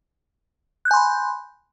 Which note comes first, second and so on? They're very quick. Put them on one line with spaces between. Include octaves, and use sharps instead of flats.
F#6 G6 G#5 C6 B5